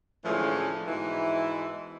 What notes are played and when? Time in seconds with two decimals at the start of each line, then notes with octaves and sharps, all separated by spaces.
0.25 A2 D3 E3 F3 G#3 C#4
0.88 G#2 B2 E3 E4